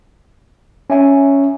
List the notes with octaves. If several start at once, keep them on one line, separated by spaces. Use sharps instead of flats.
C#4 E5 G#5